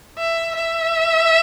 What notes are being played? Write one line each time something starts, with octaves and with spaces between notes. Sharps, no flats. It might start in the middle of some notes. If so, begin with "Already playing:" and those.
E5
E5